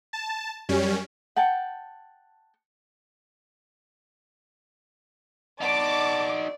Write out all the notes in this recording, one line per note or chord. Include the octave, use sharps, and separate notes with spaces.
A5
F#2 G3 C#4
F#5 G5 A5
D#4 F#4 D5 A5 D6